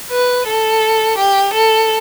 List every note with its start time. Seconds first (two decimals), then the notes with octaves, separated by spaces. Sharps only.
0.12 B4
0.48 A4
1.18 G4
1.54 A4